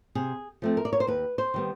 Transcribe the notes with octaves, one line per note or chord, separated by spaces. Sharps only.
C3 G#4
F3 A3 C4
A#4
D5
C#5
C5
D#2 B4
C5
D#3 G3 B3